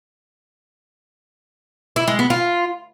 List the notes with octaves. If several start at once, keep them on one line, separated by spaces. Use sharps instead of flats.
E4
G#3
B3
F4